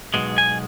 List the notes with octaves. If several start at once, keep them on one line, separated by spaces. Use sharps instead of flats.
B1 B2 G#3
G#5